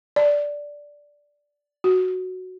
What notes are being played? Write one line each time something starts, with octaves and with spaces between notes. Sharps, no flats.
D5
F#4